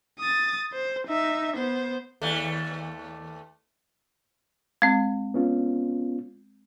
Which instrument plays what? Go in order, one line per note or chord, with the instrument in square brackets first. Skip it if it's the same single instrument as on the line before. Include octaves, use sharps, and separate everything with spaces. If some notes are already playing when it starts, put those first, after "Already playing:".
[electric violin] D#6 A6
C5
D#4 E5
B3 C5
[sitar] D#2 A3
[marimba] G#3 C4
[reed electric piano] B3 C#4 F4